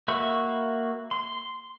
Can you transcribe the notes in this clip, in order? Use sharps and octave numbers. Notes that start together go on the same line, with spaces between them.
A#3 F#4 E5 B5 C#6
C6